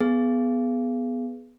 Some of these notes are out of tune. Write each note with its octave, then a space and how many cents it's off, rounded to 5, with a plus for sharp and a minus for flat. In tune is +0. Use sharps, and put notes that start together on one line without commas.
B3 +0 G#4 +10